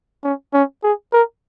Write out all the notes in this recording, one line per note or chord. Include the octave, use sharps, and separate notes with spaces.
C#4
C#4
G#4
A#4